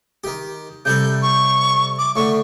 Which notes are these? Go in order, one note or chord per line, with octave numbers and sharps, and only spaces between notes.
D#3 G4
C3 G3 A4 G6
C#6
D6
A2 D3 C#6